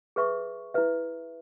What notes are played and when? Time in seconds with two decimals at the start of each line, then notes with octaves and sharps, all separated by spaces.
0.16 G#4 B4 E5 C#6
0.74 E4 B4 E5